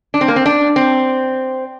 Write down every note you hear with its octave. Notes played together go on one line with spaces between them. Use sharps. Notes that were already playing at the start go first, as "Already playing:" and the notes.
D4
C4
A#3
C4
D4
C4